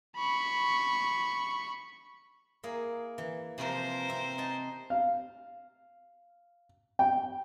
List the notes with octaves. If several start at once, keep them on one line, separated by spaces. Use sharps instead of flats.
B5 C#6
A#3 E4 G#4
E3
C3 E3 F3 A#4 C5
C4 E5
D#4 G#5 A5
F5
G5